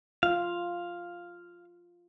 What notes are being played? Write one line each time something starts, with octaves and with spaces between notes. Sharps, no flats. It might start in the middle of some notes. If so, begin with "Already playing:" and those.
F4 F5